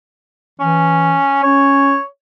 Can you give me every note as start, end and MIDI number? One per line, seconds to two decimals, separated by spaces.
0.60 1.17 52
0.60 1.40 61
1.43 1.96 61
1.43 2.03 73